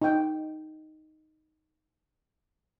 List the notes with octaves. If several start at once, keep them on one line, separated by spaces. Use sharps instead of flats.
D#4 G5